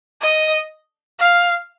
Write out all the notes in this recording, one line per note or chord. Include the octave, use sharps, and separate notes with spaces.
D#5
F5